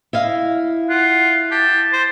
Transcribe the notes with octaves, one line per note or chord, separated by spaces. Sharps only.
E4 D#5 F5
F4 F#5
G4 A5
C5